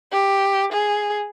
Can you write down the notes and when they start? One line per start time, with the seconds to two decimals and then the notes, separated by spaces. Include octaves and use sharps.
0.12 G4
0.72 G#4